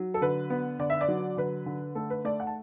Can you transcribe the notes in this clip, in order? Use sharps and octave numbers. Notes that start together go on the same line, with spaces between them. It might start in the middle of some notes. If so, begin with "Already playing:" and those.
Already playing: F#3
A4
D3 B4
B3
D3 D5
E5
D5
F#3
D3 B4
D3
A3 A4
B4
A3 D5
F#5
A5